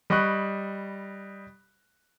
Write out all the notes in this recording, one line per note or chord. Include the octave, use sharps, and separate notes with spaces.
G3 D#5 B5 C#6 F#6